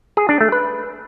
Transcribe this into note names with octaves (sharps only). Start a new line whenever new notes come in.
G#4
D4
A3
B4